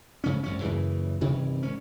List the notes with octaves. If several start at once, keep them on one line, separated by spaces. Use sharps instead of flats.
G#2 C#3 C#4
G#1 F#2 C#4
F#2 A#2 C#3 E3
G1 C3 D#3 E3
G#1 C#4